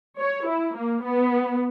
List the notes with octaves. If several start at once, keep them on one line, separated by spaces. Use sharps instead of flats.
C#5
E4
A#3
B3